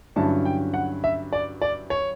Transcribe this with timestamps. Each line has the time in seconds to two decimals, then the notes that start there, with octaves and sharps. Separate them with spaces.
0.16 G2 D3 F#3 C#4 E4 A5
0.45 G5
0.74 F#5
1.04 E5
1.33 D5
1.62 D5
1.90 C#5